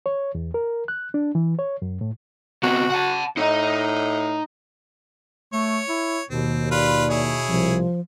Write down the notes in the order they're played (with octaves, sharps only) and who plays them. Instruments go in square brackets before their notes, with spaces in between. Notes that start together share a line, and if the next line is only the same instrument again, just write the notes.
[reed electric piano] C#5
E2
A#4
F#6
D4
E3
C#5
F#2
A2
[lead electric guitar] C3 B3 [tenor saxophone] F#4
[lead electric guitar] F#5 A5
[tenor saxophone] A2 [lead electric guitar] D#4 D#5
[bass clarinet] A3 [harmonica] C#5
[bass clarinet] E4
[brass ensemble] D#2 [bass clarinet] B2 [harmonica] C4
[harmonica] F4 B4 [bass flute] D5
[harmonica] E4 G#4 C#5
[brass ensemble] C2 [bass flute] F3